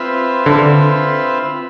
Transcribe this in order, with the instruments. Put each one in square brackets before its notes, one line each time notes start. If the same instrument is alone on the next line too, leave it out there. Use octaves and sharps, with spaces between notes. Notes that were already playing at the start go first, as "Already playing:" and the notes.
Already playing: [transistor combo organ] C4 F4 B4 E5
[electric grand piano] D3